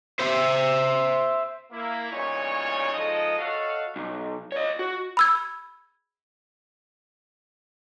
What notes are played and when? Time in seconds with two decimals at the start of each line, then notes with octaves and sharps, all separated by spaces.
0.19 C5 E5
1.72 A#3 E4
2.11 E2 G2 A#2 C#3 D#4 C#5
2.93 F3 G#3 D#4 A4 D#5
3.39 F#4 A4 C#5 D#5 F5
3.96 B1
4.52 C#5 D#5
4.79 F#4
5.17 B5 E6 G#6